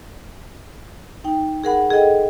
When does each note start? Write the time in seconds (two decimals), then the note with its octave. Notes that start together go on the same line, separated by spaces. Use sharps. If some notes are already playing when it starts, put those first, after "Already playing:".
1.24 D#4 G5
1.64 G#4 A#4 F#5 B5
1.90 G#4 A4 D#5 G5